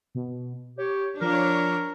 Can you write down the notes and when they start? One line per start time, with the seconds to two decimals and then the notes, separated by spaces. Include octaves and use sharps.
0.15 B2
0.78 G4 C#5
1.21 F3 D4 A#4 C#5